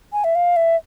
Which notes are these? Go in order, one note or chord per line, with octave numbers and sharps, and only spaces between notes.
G#5
E5
F5
E5